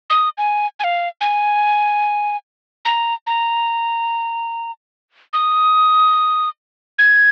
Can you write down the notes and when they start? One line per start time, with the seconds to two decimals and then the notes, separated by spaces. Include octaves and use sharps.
0.10 D#6
0.38 G#5
0.80 G#5
0.84 F5
1.21 G#5
2.85 A#5
3.27 A#5
5.33 D#6
6.99 G#6